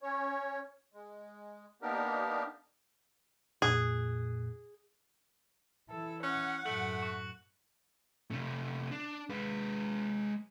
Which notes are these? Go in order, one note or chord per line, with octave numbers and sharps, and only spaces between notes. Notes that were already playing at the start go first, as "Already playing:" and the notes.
C#4 C#5
G#3
A#3 B3 D4 D#4 G4 A#4
F2 A#2 G#4 F#6
E3 E4 A4
C#4 F#5 F#6
F#2 A2 A3 F#6 C#7 F#7
C#6
C3 A3
D4
G#3 B4